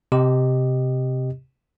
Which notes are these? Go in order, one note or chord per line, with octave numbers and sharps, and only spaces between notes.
C3 G4 D#5